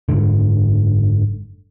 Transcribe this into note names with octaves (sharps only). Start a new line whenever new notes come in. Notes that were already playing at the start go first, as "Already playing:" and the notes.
F#1 G#2 D3